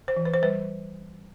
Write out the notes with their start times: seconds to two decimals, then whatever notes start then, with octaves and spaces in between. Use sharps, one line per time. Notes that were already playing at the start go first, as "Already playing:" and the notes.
0.08 C5
0.16 E3
0.25 B4
0.34 C5
0.42 G3 B4